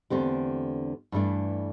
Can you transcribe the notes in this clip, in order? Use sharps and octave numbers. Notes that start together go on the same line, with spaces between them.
E2 D3 A3 C4 G4
G2 E3 A3 D4